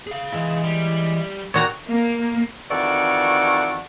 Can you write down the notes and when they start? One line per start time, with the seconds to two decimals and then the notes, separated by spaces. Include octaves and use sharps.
0.07 G#4 F5
0.33 E3 G#3 E4
0.63 G3
1.54 A#2 F#4 G4 C#5 A#5
1.89 A#3
2.71 F2 D#3 E3 F#4 A4 D5